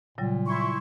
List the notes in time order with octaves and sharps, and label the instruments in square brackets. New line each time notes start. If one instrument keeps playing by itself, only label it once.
[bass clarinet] A#2 [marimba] C#3 F#3 G3
[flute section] E4 C6 C#6